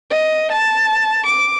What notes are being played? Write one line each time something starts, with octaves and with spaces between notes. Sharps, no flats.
D#5
A5
D6